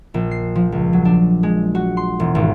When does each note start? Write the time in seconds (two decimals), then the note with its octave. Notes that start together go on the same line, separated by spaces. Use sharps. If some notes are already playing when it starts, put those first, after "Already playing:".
0.14 A#1
0.31 C7
0.55 F3
0.72 C#2
0.93 F#3
1.05 D4
1.43 G#3
1.75 F#4
1.97 C6
2.20 E1
2.35 G#1